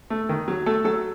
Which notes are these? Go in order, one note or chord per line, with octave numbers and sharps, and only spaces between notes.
A3
D#3
F#3
A3 A4
F#3 A4